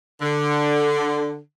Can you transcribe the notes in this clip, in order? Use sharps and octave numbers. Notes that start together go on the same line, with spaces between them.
D3